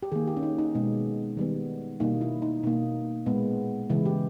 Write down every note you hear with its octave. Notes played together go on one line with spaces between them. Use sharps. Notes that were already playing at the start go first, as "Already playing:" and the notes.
G4
D#3 A#3 G#4
G4
C#4
D#4
D#4
B2 G#3 B3
D#3 G3 B3
B2 G3 A#3 D#4
E4
D#4
B2 A#3 D#4
A#2 G#3 B3
C#3 E3 G#3 E4
G4